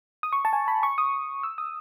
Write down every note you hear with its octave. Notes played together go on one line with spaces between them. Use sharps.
D#6
C#6
A5
G#5
B5
C#6
D#6
E6
D#6